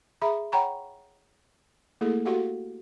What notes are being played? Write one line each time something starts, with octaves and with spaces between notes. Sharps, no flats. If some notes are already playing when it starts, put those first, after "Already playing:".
G#4 E5 A#5 B5
C#5 F#5 G5 A#5 B5 C#6
A3 A#3 E4 G#4 A4
F#4 G4 A4 F5 F#5